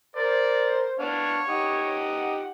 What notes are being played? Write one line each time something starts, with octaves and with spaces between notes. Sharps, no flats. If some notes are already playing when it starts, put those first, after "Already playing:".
A#4 C5 D5
B3 D4 C#5 F5
D#4 G4 F#5